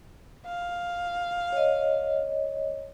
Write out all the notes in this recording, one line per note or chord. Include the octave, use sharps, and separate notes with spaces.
F5
C#5 D#5